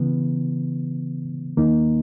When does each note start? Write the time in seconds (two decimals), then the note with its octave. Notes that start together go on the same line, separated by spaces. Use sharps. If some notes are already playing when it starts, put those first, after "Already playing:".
Already playing: C#3 E3 B3
1.57 D#2 D#3 A#3 D#4